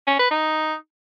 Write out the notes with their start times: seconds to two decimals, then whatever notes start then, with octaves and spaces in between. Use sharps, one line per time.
0.07 C#4
0.19 B4
0.31 D#4